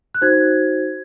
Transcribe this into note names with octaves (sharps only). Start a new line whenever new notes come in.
F#6
D#4 F#4 C5 G#6